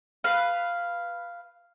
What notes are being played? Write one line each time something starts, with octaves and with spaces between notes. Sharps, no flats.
B4 F5